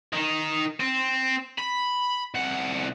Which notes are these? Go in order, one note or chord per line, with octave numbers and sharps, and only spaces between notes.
D#3 D#4
C4
B5
C2 F#5